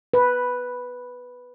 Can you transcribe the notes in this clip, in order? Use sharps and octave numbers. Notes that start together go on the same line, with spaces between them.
B4